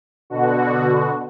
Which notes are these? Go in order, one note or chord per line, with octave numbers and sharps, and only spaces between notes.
B2 D3 F#4